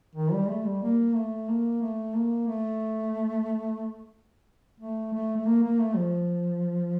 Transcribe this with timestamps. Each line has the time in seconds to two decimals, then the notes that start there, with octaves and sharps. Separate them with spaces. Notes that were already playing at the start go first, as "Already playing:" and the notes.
0.15 D#3
0.32 G3
0.49 A3
0.65 G3
0.82 A#3
1.15 A3
1.48 A#3
1.82 A3
2.14 A#3
2.48 A3
4.80 A3
5.13 A3
5.37 A3
5.46 A#3
5.63 A#3
5.79 A3
5.96 F3